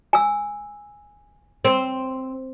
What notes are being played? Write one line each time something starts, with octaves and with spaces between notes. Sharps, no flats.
G#5 E6
C4